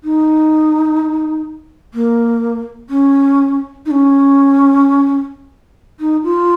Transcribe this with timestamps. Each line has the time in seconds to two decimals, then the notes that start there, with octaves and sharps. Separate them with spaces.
0.04 D#4
1.94 A#3
2.90 C#4
3.86 D#4
3.91 C#4
6.00 D#4
6.24 F4